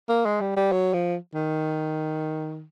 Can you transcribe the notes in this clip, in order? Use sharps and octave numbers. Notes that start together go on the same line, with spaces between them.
A#3
G#3
G3
G3
F#3
F3
D#3